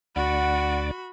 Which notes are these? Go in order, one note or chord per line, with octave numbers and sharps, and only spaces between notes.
D2 F#4 D5 F#5 B5